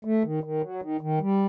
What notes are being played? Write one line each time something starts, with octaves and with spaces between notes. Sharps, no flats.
A3
D#3
D#3
F#3
D#3
D#3
G3